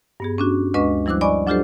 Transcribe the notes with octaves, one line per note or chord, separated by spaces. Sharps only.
G2 B3 G#4
C#4 D4 F#4
D2 G#3 D4 B4 D#5 C#6
F3 G3 E4 C5 D6 F#6
D5 D#5 G#5 B5 C#6 D6
F#3 D4 F4 G4 A4 C5